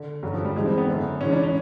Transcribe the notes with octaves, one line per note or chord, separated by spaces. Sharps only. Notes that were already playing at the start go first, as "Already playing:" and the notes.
Already playing: D3
G2 D3 F#3
F3
G3
G#2 E3 G#3
C4
B3
F#2 D3
G#2 E3 C#4
D4
C#4